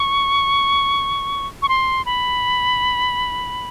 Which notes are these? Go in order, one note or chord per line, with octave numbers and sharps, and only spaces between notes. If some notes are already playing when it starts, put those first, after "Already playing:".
Already playing: C#6
C#6
C6
B5